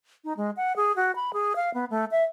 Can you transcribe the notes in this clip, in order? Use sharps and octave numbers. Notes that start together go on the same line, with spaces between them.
D#4
G#3
F#5
G#4
F#4
B5
G#4
F5
B3
A3
E5